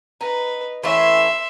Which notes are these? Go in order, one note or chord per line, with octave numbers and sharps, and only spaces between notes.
D#4 B4
E3 A3 C#4 E5 C6